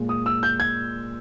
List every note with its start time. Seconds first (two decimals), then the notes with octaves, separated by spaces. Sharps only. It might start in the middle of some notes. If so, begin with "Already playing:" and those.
Already playing: A#2 G#3
0.09 D#6
0.26 E6
0.43 G6
0.60 G#6